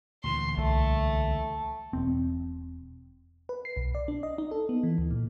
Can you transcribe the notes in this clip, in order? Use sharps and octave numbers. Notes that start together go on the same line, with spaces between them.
D2 A#2 E3 C6
C2 A3
E1 C4
B4
C7
B1
D5
D4
D#5
D#4
A4
B3
E3
D2
A#2